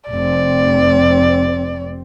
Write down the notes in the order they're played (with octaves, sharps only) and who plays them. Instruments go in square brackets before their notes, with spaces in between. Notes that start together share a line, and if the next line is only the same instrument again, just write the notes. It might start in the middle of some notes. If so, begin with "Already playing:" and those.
[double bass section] F1 C4 [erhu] D5